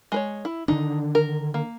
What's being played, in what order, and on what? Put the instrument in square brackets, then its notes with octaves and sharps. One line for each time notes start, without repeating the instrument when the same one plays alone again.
[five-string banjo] G#3 B4 C#5
E4
[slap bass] D3 D#3 D4 [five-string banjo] D#4
[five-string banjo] A#4
A#3